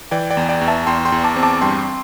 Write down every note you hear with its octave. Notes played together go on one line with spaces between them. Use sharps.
E3 D5 G5
D5 G5
E2
D5 G5
E2
E5 A5
E2 G5 C6
G5 C6
E2
A5 D6
C4
A5 D6
G2 G5 C6